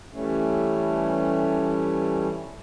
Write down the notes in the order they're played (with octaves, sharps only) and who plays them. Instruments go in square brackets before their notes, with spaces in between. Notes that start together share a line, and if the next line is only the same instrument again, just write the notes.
[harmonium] E3 G3 A3 C#4